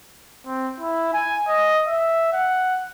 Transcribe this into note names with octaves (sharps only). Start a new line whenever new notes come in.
C4
E4
G#5
D#5
E5
F#5